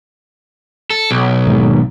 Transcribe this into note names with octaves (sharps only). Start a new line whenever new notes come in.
A4
B1
G#1 D#2